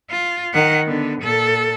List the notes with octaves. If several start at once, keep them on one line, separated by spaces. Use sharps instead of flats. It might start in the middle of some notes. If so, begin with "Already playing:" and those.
F4
D#3 F#5
D3 B3
A#2 A4